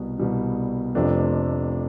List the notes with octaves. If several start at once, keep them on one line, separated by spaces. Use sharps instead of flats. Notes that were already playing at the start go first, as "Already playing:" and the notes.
Already playing: C2 B2 G3 B3
C2 B2 G3 B3
F1 F2 C3 F3 A3 D4